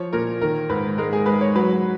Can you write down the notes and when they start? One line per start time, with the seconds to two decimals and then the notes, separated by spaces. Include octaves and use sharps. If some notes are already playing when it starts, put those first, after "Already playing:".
Already playing: F3 C#5
0.13 A#2 A#4
0.41 D#3 A#4
0.69 G#2 B4
0.98 G#3 A#4
1.13 G#4
1.26 G#3 B4
1.41 C#5
1.55 F#3 B4